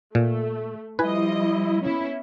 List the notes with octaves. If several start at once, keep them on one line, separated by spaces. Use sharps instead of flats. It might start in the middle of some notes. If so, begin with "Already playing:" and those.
A#2 A3
F3 G3 E4 B4 D#5 G#5
B3 C#4 E4